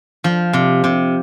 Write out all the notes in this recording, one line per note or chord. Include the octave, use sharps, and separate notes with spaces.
F3
C3
C3